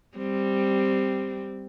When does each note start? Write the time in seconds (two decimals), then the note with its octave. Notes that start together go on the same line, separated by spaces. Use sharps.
0.17 G3 C4